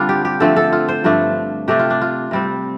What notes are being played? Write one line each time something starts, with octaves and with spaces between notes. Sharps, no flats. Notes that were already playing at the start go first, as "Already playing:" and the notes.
Already playing: D3 G3 C4 D4 F4
G4
G4
D3 F3 A3 C4 A4
A4
F4
C5
G2 F3 A3 D4
C3 A3 D4 G4
F4
D4
F4
C3 G3 C4